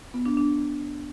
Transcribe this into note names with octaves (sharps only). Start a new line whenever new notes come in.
B3
D4
D4